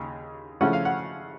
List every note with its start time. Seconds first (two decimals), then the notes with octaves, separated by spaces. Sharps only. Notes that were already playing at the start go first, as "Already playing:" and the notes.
Already playing: D#2 C#3
0.61 C#3 F3 A3 C#4 E4 F#5
0.73 F5
0.85 F#5